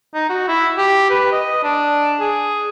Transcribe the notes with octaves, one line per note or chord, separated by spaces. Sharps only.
D#4
F#4
E4
G4
B4
D#5
D4
G#4